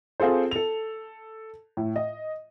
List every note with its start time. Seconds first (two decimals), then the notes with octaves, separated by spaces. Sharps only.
0.20 C4 F4 G#4 A4 C5
0.51 A4 F7
1.77 A2
1.96 D#5